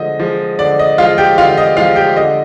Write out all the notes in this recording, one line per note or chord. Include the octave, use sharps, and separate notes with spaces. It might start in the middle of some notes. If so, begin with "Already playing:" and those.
Already playing: D3 F3 G#3 D#5
F3 G#3
D3 D5
D#5
F3 G#3 F4 F5
G4 G5
D3 F4 F5
D#5
F3 G#3 F4 F5
G4 G5
D3 D#5